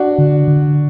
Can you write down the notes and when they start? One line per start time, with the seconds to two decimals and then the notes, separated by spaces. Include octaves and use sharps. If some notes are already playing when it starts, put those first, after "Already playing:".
Already playing: D4 F#4
0.18 D3
0.48 D3